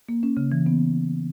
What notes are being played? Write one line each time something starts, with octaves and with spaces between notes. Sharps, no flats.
A#3
C#4
C#3
E3
B3